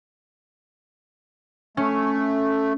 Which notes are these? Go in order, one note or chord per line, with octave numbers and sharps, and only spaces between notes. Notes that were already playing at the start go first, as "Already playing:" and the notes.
A3 C#4